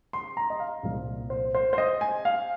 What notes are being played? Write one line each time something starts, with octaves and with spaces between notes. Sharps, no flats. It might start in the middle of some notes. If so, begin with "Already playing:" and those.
C6
A#5
D#5
F5
C2 A#2 F3
C5
C5
C5
D#5
G#5
F5